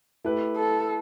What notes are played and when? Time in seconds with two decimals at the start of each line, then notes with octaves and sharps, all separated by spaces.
0.24 A3 E4 G4 B4
0.56 A4